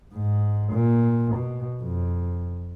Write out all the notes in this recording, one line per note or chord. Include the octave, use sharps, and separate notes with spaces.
G#2
A#2
B2
F2